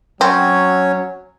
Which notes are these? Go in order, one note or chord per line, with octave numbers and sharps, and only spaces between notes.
F#3 C4 C#4 C#5